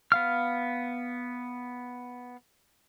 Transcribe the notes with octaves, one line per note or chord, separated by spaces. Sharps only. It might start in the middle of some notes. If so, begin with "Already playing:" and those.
B3 F5 F6